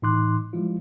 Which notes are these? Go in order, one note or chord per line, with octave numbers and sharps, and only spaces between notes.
A2 E3 D#4 C6 D6 F#6
F3 G3 G#3 E4 F4